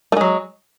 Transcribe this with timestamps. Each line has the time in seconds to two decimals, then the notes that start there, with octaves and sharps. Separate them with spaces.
0.12 A3
0.17 G#3
0.21 F#3